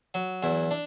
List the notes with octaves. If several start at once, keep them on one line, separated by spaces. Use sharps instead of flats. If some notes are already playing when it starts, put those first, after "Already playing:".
F#3
E2 E4
D4